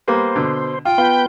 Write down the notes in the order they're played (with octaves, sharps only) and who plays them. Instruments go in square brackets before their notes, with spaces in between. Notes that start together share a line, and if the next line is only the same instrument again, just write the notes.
[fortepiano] G3 A#3 B3 [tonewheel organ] C5
[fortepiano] B2 D3
[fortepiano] F4 [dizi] G5
[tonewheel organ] B3 B4 G6 [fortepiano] F4